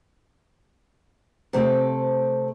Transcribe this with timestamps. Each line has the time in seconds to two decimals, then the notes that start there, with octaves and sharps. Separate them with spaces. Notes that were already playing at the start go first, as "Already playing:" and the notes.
1.53 C3 A3 C4 A4